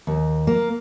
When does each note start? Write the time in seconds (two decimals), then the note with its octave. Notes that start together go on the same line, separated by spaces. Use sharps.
0.07 D#2
0.47 A#3